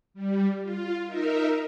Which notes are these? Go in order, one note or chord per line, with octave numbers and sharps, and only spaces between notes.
G3
F4
D#4 A#4 E5